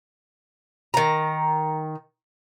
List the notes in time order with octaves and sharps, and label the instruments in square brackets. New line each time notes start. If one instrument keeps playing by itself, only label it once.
[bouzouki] D#3 A#5